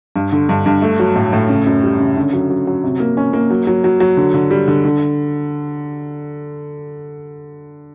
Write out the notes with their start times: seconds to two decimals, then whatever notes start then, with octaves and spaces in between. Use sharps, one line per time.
0.16 G2
0.32 D3
0.49 G2
0.66 G2
0.82 A3
0.99 F#3
1.16 A2
1.33 A2
1.49 C#3
1.66 F#2
1.83 G3
2.00 C#3
2.16 D3
2.33 F#3
2.50 F#3
2.67 F#3
2.84 C3
3.00 A#3
3.17 C#4
3.33 A#3
3.50 F#3
3.67 F#3
3.84 F#3
4.00 F#3
4.17 D3
4.34 D3
4.51 G3
4.68 D3
4.85 D3